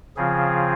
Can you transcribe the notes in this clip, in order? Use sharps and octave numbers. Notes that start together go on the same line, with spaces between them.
C#3 F3 C4 F4 G#4